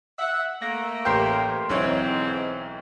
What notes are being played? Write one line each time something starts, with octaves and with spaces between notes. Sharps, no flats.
E5 F#5
A3 A#3 A#6
A1 G4 A#4 G5 C6
B1 G#2 E3 C4 C#5